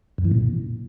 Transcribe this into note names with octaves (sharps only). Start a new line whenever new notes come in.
F#2
E3
A#2